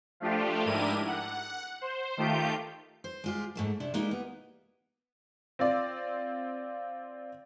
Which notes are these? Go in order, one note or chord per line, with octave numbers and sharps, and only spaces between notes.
F3 A3 D4 F4 G4
G#2 D4 E4 G4 A#4 D#7
F#5
C5
D#3 A3 F4 G4 G6
C5
G#3 F4 G4
G#2 A3 A#3
C3 D4 E4
G#3 A#3 D#4 E4 G4 A#4
B3
C4 F4 D5